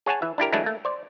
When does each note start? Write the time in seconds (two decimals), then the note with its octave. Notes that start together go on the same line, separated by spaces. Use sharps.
0.06 G#4 C#5 F#5 G#5 A5
0.22 E3 E5
0.38 D4 E4 G4 A#4
0.52 E3 F#3 G#3 A3 D4 E4
0.64 A3 A#3
0.85 C5 D5